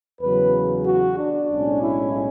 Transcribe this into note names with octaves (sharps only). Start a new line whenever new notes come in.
E2 C#3 F#3 B4
F#4
D4
B1 A2 G#3 C#4
E4